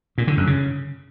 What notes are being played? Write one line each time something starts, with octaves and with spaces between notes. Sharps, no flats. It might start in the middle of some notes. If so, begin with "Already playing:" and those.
A#2
D3
F#2
C#3